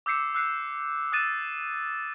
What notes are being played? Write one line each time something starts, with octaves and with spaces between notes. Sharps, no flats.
D6 E6 G6 C7 C#7 E7
E6 F#6 C7 C#7
D#6 E6 F#6 A6 D#7 E7